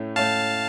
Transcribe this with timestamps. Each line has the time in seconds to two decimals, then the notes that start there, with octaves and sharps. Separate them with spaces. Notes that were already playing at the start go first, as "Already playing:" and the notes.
Already playing: A2 A3 C#4
0.16 A2 A3 C#4 F5 A5